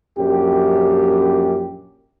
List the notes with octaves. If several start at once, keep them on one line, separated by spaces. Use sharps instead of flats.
A#1 F#2 G4